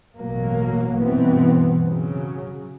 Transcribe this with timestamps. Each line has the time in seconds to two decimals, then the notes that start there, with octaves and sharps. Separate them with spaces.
0.18 A1 B2 F#3 A#3
1.01 G2 B2 E3 B3 C4
1.88 C#3 F#3